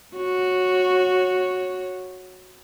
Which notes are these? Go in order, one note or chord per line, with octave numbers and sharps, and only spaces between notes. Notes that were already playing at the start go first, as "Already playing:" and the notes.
F#4 C#5